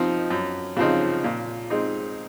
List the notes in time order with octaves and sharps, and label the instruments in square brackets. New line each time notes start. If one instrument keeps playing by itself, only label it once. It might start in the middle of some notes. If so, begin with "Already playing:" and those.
Already playing: [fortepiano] F3 C4 D#4
F#2
C#3 F3 C4 D#4
A#2
G#3 C4 D#4